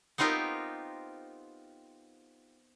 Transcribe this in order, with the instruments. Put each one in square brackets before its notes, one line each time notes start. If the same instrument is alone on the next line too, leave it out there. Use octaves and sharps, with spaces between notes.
[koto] B3 C4 D#4 F4 G4 A#4